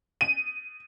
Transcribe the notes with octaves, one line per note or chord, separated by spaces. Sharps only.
D#7